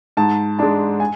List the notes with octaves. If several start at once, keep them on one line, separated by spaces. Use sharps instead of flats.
G#2 A5
G#3 D4 A5
G#5